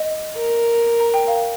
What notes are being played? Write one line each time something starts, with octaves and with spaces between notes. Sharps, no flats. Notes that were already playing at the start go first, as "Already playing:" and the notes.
Already playing: D#5
A#4
A#5
G5
F5